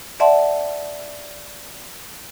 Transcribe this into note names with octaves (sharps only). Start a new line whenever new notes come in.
D5 E5 F#5 A5 C6